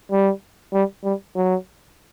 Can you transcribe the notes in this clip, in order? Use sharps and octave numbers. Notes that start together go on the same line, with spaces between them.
G3
G3
G3
F#3